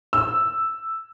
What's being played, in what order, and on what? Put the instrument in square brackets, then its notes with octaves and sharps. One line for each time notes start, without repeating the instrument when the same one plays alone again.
[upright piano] E6